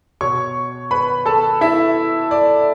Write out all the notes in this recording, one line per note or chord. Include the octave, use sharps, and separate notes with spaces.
B2 C#5 C#6
B4 B5
A4 A5
E4 E5
D5